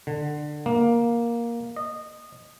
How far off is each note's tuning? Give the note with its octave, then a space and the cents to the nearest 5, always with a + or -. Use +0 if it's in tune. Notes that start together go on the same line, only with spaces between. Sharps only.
D3 +20
A#3 +10
D#5 -20